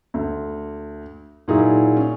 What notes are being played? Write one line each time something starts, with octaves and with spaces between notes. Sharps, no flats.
D2
A#2 F#3 D#4 E4 G#4
C#4